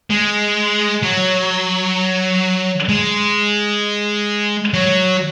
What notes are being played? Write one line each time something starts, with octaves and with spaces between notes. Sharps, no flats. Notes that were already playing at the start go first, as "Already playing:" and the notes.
G#3
F#3
G#3
F#3